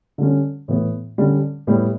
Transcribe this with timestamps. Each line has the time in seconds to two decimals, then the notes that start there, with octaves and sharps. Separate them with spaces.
0.18 D3 G3 C#4
0.68 A2 E3 B3
1.18 D3 G3 C#4
1.67 A2 G3 B3